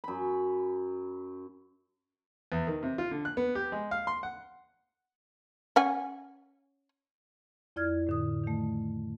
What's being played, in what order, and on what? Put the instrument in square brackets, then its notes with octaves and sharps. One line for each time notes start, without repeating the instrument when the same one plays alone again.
[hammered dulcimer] F#2 B5
[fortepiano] E2
D#3
C3
F4
D3
F#6
B3
G4
G#3
F5
C6
F#5
[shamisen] C#4 F#5 G#5
[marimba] F2 E4 D5 F6 G#6
A2 D3 D#6
D#3 A3